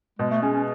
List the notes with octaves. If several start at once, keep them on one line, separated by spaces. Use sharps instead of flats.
B2 G#3
A3
G#3 C#4
C#4